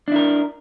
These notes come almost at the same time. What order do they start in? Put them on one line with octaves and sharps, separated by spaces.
D4 E4 A#4